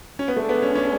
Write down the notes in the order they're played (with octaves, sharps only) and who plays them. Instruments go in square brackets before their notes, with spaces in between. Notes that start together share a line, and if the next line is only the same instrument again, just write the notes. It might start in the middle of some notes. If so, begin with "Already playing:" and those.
[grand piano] C#4
B3
[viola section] D3 G#3 D4 G#4 [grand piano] A3
[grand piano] B3
C#4
C#4